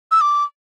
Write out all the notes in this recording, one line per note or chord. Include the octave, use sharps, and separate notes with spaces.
E6
D6